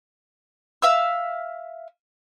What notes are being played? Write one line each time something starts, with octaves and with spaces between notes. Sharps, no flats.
E5 F5 E6